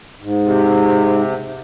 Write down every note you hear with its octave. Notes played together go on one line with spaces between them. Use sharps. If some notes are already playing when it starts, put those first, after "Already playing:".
G#2
C3